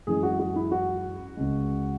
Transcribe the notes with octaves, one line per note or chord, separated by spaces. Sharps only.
F#2 E3 G#3 G#4
F#4
F#4
E4
F#4
C#2 C#3 G#3